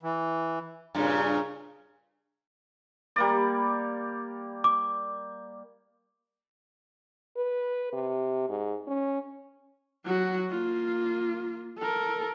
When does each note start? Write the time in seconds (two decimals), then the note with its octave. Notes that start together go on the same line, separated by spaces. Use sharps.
0.03 E3
0.95 G2 A#2 C#3
3.16 G3 A#3 D5
4.64 D6
7.37 B4
7.93 C3
8.49 G#2
8.88 C#4
10.05 F#3 F#4
10.50 A#3 F4
11.78 A4 A#4